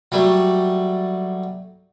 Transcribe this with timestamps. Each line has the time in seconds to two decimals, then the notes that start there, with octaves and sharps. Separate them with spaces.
0.12 F#3 G3 A3